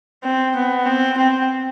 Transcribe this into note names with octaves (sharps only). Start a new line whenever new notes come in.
C4
B3
C4
C4